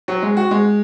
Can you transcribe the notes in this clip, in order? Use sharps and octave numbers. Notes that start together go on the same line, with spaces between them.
F#3
G#3
F#4
G#3